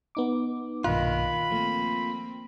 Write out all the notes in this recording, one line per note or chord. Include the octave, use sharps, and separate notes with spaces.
B3 D#4 D6
B1 G2 A#2 D#3 F4 B5 F#6
F3 A3 A#3 C4